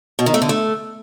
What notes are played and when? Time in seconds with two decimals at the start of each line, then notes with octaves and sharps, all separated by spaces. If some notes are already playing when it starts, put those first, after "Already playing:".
0.19 B2
0.26 D#3
0.34 A3
0.42 D3
0.49 A3